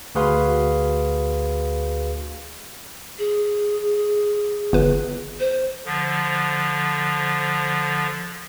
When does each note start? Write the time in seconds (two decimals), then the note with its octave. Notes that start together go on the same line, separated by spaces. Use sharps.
0.15 D2 F#4 G#4 B4 F5 C6
3.18 G#4
4.73 G1 B4
5.40 C5
5.86 D3 F3